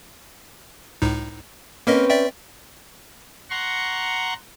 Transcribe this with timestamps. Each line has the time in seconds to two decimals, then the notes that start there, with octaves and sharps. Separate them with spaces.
1.02 C#2 A2 D#4
1.87 A#3 C4 C#4 A#4 B4 D#5
2.10 D5 E5 G5
3.50 F#5 A#5 C6 C#6